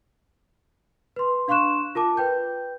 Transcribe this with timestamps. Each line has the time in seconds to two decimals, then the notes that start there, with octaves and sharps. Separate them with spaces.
1.16 B4 C6
1.48 D4 F5 C6 C#6 F#6 E7
1.95 F4 A#4 A5 D6
2.17 B4 G5 G6